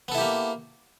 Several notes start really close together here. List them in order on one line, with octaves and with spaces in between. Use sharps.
B3 A4 E4 G4 A#3